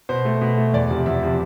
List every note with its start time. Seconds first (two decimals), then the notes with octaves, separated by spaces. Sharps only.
0.09 B2 C5
0.25 A3
0.41 B2
0.57 A3
0.73 E2 D5
0.90 C3 F3
1.06 E2 E5
1.23 C3 F3